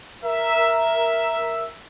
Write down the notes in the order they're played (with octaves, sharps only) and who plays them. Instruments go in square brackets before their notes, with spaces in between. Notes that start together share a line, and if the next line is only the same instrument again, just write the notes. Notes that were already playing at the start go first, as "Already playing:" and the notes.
[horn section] A#4 E5